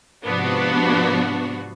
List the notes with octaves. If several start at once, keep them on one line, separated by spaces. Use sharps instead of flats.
G#2 C3 F3 B3 D4 F#4